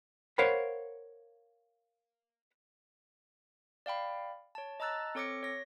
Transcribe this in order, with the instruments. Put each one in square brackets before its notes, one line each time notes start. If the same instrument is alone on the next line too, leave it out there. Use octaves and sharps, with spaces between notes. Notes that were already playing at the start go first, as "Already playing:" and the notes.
[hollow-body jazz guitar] A#4 C5 C#5 F5 F#5 B5
[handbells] D5 F5 G5 B5
C#5 A5
D#5 A5 A#5 E6 F#6 A6
C4 A4 C#5 D6 A#6 C#7
C#5 A#6